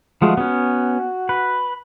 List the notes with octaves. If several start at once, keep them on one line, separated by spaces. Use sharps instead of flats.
F3 G#3 A3 F#4
B3 C#4
B4